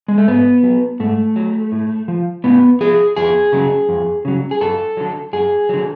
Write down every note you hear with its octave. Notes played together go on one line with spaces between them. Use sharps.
G#3
A3
G#2 B3
F#3
G#2 A3
F#3
A2
F3
A2 B3
F3 G#4
F2 G#4
C#3 F#3
F2
C#3 F#3
G#4
F#2 A4
D3 F#3
F#2 G#4
D3 F#3